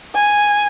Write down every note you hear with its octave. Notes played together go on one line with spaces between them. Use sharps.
G#5